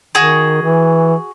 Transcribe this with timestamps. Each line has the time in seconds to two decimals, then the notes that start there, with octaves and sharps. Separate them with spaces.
0.15 D#3 F#4 G#4
0.62 E3